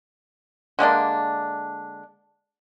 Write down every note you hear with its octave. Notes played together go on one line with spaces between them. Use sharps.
D3 G#3 A#3 D4